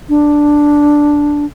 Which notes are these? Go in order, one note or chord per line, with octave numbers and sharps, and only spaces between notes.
D4